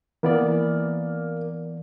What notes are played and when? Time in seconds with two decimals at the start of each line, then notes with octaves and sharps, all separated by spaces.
0.23 E3 A#3 B3 D5